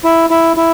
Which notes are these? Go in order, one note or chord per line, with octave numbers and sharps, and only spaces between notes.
E4
E4
E4